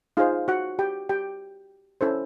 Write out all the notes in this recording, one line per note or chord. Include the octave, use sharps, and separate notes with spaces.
D#4 F4 G#4 C5 F5
F#4 F#5
G4 G5
G4 G5
C#4 E4 A4 C5